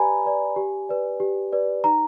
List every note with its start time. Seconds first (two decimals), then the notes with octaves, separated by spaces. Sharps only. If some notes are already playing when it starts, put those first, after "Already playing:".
Already playing: G4 B4 D5 G#5 A#5 B5
0.26 B4 D5
0.56 G4
0.89 B4 D5
1.20 G4
1.53 B4 D5
1.84 D#4 A#5